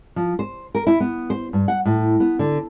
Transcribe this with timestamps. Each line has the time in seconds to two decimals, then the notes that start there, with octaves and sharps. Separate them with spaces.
0.16 F3
0.39 C5
0.75 A#4
0.87 E4
1.00 B3
1.30 C5
1.53 G2
1.68 F#5
1.85 A2
2.20 B3
2.39 D3